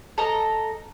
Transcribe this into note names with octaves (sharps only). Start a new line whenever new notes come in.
A4 D#5 A#5